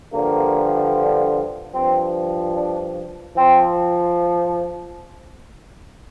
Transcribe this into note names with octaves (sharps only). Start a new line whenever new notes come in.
G2 D3 F3 A#3
G2 F3 C4
D4
F3 C4